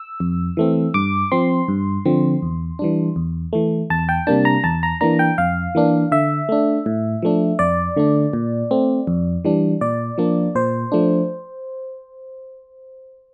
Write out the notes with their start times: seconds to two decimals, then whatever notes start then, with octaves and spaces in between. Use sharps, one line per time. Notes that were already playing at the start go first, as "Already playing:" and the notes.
Already playing: E6
0.20 F2
0.57 E3 A3 C4
0.94 G2 D6
1.32 F3 C4 C6
1.68 G2
2.05 D3 F3 C4
2.42 E2
2.79 E3 G3 D4
3.16 E2
3.53 E3 A3
3.90 E2 A5
4.09 G5
4.27 C3 G3 A#3 D4 A5
4.45 A#5
4.64 E2 A5
4.83 A#5
5.01 E3 A#3 D4 A#5
5.19 G5
5.38 F2 F5
5.75 E3 A#3 D4
6.12 D3 E5
6.49 A3 D4
6.86 A2
7.22 F3 A3 D4
7.59 F2 D5
7.96 D3 A3 D4
8.33 A#2
8.71 A3 C4
9.07 F2
9.45 E3 G3 D4
9.81 A#2 D5
10.18 F3 A#3 D4
10.55 A#2 C5
10.92 F3 A3 D4